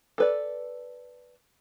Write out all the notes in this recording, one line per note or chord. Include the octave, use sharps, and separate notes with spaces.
A4 B4 D5